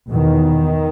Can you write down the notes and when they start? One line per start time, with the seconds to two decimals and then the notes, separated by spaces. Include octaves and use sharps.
0.10 E2 B2 D#3